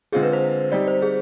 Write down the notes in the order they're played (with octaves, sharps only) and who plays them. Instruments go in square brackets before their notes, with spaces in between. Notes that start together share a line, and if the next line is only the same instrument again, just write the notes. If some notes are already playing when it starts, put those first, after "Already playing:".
[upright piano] D3 G#3 C4 F4 [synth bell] G#4
[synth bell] B4
C5
[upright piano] G3 C4 D#4 G4 [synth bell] D5
[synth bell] C5
G#4